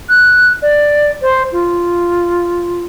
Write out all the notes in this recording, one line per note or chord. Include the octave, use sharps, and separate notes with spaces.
F#6
D5
C5
F4